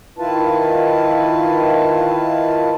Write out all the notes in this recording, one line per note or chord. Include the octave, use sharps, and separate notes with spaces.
D#3 E4 F4 B4 A5